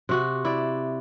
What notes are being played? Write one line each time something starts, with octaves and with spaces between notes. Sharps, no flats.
C3 F#4
E4 D5